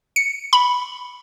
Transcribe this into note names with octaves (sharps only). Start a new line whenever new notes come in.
C#7
B5